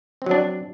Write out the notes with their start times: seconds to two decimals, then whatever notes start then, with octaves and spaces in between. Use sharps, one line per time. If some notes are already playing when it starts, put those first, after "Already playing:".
0.22 C4
0.26 F#3
0.31 D4